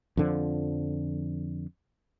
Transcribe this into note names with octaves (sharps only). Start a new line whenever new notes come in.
F2 D3 F3